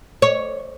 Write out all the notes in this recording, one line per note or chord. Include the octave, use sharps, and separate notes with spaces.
C#5